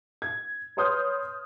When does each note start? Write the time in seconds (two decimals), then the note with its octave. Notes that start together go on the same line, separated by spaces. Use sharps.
0.22 G#6
0.77 B4 C#5 C6 D#6 F6 G6